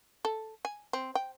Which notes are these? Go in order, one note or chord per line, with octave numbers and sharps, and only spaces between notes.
A4
G#5
C4
G5